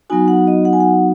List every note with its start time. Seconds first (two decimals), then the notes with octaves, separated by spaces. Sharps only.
0.10 F#3 B3 D#4 F#4 G#5
0.28 F#5
0.47 D#5
0.65 F#5
0.73 G#5
0.80 F#5